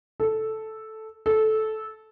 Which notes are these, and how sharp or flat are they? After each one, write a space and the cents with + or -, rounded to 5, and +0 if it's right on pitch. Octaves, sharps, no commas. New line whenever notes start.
A4 -5
A4 -15